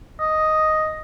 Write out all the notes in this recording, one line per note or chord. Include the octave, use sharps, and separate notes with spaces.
D#5